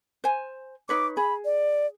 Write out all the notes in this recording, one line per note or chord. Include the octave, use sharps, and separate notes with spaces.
C5 G#5
D#4 B4 C#5 D6
G#4 B5
D5